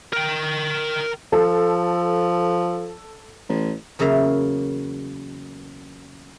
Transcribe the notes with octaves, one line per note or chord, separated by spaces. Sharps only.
A#4 G5
F3 A4
A1
E2 C#3 F#3 A#3 E5 F5